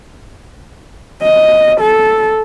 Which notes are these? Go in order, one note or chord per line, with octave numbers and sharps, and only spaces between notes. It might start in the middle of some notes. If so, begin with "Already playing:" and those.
D#5
A4